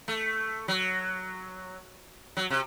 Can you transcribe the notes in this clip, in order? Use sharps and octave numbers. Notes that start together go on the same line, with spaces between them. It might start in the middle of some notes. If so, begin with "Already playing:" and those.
A3
F#3
F#3
C3